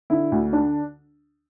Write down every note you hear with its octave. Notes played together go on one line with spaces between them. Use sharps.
D3 E4
D2
D3 D4